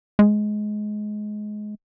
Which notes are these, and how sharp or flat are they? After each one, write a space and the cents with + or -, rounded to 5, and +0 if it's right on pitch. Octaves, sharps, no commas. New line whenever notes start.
G#3 +20